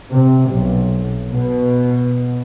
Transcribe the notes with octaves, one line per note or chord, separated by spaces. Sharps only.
C3
B1
B2